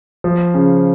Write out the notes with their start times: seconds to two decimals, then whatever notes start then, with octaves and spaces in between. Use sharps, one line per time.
0.24 F3
0.54 C#3